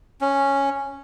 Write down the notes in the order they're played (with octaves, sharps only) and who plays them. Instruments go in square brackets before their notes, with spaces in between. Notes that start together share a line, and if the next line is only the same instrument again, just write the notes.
[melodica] C#4